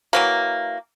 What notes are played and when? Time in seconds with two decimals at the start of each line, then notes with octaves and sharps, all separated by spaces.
0.13 E3 F#3 A#3